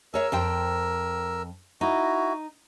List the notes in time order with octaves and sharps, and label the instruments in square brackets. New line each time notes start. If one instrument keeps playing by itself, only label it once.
[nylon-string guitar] G#4 C#5 E5 [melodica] A#4 E6
[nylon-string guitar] F2 C5 G5
[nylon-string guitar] D#4 [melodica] E4 F#4